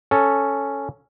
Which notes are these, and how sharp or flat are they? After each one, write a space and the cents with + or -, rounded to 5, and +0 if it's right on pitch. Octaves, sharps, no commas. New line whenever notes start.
C#4 +0 A4 +0